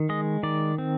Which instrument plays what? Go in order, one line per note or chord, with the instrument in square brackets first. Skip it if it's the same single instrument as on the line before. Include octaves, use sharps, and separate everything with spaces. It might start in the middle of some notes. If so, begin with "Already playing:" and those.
Already playing: [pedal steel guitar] D#3
G#3 D#5
D#3 D5
C4